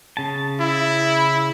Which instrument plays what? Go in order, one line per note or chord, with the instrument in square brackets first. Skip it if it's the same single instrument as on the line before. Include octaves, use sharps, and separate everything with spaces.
[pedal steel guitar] C#3 A5
[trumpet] E4